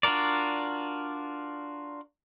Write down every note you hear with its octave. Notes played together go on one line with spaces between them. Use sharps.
D4 F4 F#4 A#4 D5